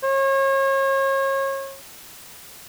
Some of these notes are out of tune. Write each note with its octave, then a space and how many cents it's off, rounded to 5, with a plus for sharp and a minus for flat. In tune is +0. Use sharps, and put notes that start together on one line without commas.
C#5 -35